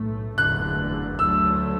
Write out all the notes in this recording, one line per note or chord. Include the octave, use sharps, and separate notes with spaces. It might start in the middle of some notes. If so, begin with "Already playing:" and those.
Already playing: B1 A2 A3
F#1 E2 D3 A3 F#6
D2 D3 F#3 A3 E6